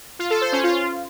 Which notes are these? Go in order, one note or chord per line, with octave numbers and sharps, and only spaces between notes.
F4
A4
C5
C#4
F4